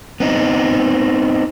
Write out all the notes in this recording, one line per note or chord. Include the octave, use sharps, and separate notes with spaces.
B3 C4 D#4